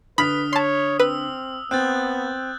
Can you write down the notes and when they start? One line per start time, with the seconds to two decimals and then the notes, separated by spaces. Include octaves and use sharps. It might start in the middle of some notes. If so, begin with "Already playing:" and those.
0.18 D3 B4 B5 D#6 F6 B6
0.53 C#5 A5 C6
0.99 C4 B4 E6
1.71 B3 C4 F#6 G6 A6